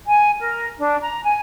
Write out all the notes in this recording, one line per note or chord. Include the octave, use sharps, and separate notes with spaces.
G#5
A#4
D4
A#5
G#5